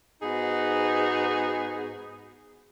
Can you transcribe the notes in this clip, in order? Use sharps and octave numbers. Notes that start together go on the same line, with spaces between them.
G#2 B3 D#4 F#4 G#4